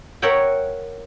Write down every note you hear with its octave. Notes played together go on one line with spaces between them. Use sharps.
A#4 C#5 E5 F#5 G5